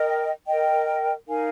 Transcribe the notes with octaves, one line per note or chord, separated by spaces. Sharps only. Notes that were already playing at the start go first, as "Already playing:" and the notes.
Already playing: A#4 D#5 G5
A#4 D#5 G5
D#4 A#4 F5 G#5